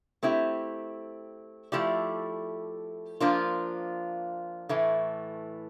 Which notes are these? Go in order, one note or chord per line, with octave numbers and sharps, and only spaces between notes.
A3 C4 E4 G4
F3 A3 E4 G4 D5
F3 A#3 D4 F4
A2 E3 A3